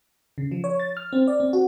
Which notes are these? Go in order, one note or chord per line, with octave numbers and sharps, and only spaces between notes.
C#3
F3
C#5
A6
F6
C4
D5
C4
F#4